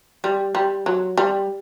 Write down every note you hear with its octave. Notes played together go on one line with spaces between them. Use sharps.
G3
G3
F#3
G3